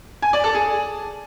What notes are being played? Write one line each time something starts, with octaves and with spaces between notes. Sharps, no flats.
G#5
D5
A4
G#4